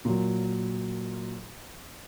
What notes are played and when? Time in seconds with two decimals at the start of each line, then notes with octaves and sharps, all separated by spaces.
0.05 A#2 F#3